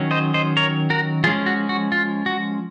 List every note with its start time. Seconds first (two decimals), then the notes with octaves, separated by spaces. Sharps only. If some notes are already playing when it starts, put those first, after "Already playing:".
Already playing: D#3 F#3 C#4
0.11 C5 D#5
0.34 C5 D#5
0.57 A#4 C#5
0.90 F#4 A#4
1.24 F3 G#3 C#4 F4 G#4
1.46 F#4
1.69 F#4
1.92 F4
2.26 F#4